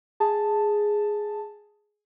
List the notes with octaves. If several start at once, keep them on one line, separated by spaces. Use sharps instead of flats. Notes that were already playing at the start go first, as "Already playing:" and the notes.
G#4 A5